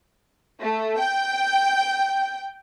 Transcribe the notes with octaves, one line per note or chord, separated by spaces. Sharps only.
A3
G5